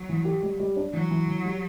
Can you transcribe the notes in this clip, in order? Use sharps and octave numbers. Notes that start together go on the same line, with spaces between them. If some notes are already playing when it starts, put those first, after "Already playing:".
Already playing: F#3
E3
G4
G3
G3
D4
E3 F#3
E3
E3
G3